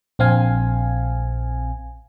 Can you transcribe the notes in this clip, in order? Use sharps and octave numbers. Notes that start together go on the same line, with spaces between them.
A#1 C4 F5 G#5